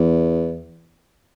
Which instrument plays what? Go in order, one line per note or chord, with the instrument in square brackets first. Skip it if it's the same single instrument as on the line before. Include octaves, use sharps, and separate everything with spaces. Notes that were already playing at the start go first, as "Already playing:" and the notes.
Already playing: [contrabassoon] E2